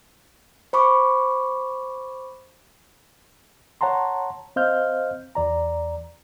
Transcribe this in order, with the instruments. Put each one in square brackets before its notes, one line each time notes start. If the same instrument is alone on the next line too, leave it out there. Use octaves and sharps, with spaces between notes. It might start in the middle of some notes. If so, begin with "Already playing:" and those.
[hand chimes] C5 B5 C#6 D6
[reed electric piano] C#5 F#5 A5 A#5 C6
C4 C5 D#5 F5 F6 G6
E2 D5 A#5